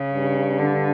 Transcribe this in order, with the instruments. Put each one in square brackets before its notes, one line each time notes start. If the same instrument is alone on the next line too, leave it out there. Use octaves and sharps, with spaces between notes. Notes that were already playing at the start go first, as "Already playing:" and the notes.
Already playing: [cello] C#3
[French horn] G2
[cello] D3